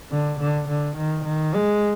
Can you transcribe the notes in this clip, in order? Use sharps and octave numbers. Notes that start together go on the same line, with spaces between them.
D3
D3
D3
D#3
D#3
G#3